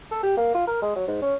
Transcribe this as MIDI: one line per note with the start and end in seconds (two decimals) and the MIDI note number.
0.11 0.21 69
0.23 0.37 67
0.37 0.53 58
0.54 0.66 65
0.67 0.80 70
0.82 0.94 56
0.96 1.07 54
1.08 1.19 44
1.22 1.35 61